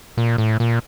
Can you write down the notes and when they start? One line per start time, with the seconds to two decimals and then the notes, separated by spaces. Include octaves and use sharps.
0.17 A#2
0.38 A2
0.60 A#2